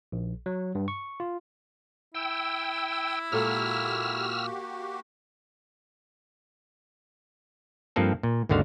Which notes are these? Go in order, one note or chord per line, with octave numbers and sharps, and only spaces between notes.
A#1
F#3
G2
C#6
F4
E4 G5 E6
A#2 G#3 A#3 F#4 G4 A4 E6 F6
G2 F3 A#3 C4 A4
A#2
G#1 D#2 D3 F#4 F5